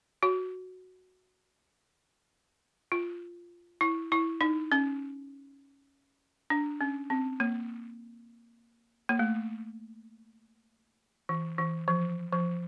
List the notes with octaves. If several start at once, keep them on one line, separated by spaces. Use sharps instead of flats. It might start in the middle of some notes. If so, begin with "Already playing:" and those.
F#4
F4
E4
E4
D#4
C#4
D4
C#4
C4
A#3
A#3
A3
E3
E3
F3
F3